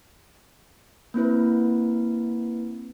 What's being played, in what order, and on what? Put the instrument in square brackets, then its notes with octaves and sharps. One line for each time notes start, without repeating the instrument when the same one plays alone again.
[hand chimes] A#3 C4 E4 B4